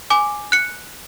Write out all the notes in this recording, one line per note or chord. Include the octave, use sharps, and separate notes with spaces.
G#5 D6
F#6 C#7